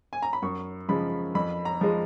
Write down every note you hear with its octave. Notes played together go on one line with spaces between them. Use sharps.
G#5
A#5
B5
F#2 C#6
C#3 F3 G#3 B5
F2 B5
A#5
F3 G#3